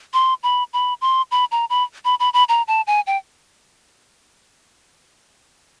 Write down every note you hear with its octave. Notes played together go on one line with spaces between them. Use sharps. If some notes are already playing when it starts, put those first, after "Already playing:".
C6
B5
B5
C6
B5
A#5
B5
B5
B5
B5
A#5
A5
G#5
G5